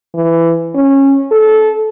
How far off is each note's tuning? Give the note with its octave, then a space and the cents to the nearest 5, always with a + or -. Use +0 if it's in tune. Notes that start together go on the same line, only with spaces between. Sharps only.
E3 +15
C#4 -15
A4 -20